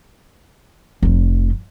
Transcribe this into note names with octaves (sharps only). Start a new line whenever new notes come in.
F1 F3